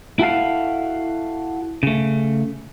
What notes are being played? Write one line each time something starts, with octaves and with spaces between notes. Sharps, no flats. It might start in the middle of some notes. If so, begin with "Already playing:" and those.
E4 F#4 A4 F5
C#3 A3